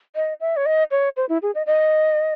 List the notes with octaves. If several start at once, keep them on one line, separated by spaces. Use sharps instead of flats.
D#5
E5
C#5
D#5
C#5
C5
E4
G#4
D#5
D#5